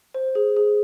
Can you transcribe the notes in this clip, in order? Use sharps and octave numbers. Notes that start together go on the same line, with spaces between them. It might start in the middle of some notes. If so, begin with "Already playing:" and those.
C5
G#4
G#4